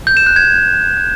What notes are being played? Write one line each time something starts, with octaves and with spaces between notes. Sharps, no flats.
G6
E7
F#6
G#6